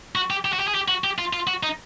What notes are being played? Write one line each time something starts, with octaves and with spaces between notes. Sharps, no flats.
F#4
G4
G4
F#4
G4
G#4
G4
F#4
G4
F4
F4
F#4
D#4